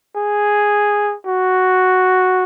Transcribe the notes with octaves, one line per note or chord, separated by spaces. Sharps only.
G#4
F#4